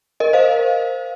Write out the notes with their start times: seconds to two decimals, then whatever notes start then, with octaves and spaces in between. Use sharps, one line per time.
0.20 A#4 D#5
0.33 C5 F5